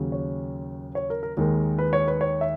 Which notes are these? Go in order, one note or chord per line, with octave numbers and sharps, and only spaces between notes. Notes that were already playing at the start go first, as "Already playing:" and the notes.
Already playing: D#2 C#3 F#3 C#4
C#5
C#5
A#4
A#4
D#2 D#3 G#3 A#4
B4
C#5
B4
C#5
E5